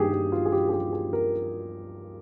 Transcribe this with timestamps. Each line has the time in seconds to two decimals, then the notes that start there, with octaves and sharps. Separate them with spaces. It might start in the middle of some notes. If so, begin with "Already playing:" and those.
Already playing: G2 D#3 A#3 G4 G#4
0.13 G4
0.32 F4
0.45 G#4
0.52 G4
0.69 G#4
0.73 G4
0.92 G#4
1.13 A#4